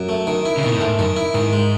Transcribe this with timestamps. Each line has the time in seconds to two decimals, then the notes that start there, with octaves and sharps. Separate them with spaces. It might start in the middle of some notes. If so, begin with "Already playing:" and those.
Already playing: F#2
0.09 A3
0.27 D#3
0.45 E4
0.57 C#3
0.63 B2 D#3
0.73 A2
0.81 G#2 A3
0.99 F#2 D#3
1.16 E4
1.34 G#2 D#3
1.53 G#3